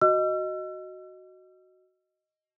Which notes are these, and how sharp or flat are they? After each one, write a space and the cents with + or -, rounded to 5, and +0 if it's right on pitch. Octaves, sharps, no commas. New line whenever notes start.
F#4 +0 D#5 +0 E6 +40